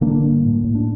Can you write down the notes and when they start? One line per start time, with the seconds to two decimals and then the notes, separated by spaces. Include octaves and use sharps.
0.01 D3 A#3 D4
0.22 G2
0.43 A2
0.64 A2
0.75 D4